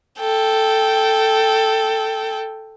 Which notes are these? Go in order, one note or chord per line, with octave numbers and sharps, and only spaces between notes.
A4 G5